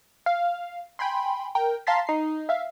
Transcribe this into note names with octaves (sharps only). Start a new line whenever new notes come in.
F5
G5 G#5 B5 C6
A#4 G5
F5 A5 A#5 C6 A6 B6
D#4 C7
E5 F5